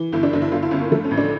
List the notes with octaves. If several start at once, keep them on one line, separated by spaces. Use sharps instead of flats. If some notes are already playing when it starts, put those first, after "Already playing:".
Already playing: E3
G1 E4
D4
G1 D4
E4
G1 F4
E4
G1 C#4
A#3
F3 A3
C#4
A1
D4